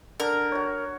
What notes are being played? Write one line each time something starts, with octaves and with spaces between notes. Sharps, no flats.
D3 A#4
F#4 C#5